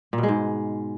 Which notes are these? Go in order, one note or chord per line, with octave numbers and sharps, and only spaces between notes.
A#2
B2
G#3
G#2